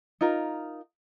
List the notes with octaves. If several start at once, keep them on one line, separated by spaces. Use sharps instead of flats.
D#4 F4 A#4